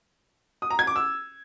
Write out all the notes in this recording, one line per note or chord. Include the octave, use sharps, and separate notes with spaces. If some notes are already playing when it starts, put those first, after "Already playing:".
D#6
A#5
G#6
D6
E6